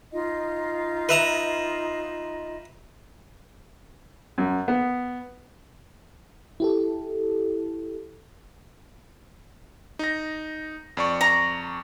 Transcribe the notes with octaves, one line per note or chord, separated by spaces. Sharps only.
D#4 F4 D#5
B4 E5 A#5
F#2
B3
E4 G4 A4
D#4 A#6
F2 D5 C#6
A#5